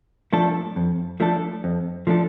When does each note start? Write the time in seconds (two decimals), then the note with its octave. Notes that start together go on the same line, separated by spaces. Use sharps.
0.33 F3 A3 D4 A4
0.76 F2
1.20 F3 A3 D4 A4
1.64 F2
2.07 F3 A3 D4 A4